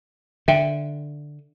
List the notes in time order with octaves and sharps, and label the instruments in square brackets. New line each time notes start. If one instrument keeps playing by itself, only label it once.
[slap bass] D3 [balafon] E5 G5